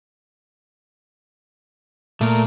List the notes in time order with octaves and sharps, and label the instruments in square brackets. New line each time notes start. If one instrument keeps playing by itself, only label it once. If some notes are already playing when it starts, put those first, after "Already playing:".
[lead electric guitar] A#2 [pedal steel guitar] A3 A#4